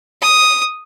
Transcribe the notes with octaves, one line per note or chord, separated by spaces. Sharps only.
D#6